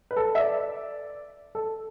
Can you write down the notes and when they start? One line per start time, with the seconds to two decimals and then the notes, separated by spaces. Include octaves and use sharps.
0.11 B4
0.16 A4
0.35 E5
0.39 D5
1.55 A4